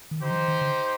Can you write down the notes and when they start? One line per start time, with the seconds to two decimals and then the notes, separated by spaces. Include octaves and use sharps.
0.11 D#3
0.21 D3 D#4 G4 C5
0.31 F3
0.36 D#3
0.48 D#3
0.62 D3